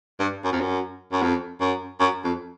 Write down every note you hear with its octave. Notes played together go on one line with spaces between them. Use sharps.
G2
F#2
F2
F#2
F#2
F2
F#2
F#2
F2